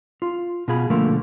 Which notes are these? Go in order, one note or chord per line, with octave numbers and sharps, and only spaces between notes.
F4
B2 F4 G#4 B5
B2 D3 F3 A3 A#3